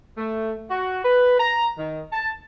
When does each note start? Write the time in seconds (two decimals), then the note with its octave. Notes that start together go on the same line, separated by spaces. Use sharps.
0.18 A3
0.71 F#4
1.05 B4
1.40 A#5
1.79 D#3
2.13 A5